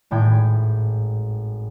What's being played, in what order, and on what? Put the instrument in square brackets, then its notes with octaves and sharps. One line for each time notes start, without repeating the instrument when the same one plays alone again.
[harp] G#1 A2 G5 G#6